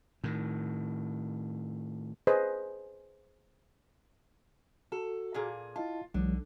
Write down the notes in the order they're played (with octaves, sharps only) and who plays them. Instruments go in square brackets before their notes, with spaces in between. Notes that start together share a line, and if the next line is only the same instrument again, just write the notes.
[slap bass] A2 D#3
[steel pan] G#4 B4 C5 D#5
[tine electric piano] F#4 [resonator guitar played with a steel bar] A4
[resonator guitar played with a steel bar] A#2 A#3 G#4
[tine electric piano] E4 D#5 A5 [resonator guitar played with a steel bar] F4
[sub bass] B1 [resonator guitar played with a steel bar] D3 [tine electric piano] E3 F#3 G#3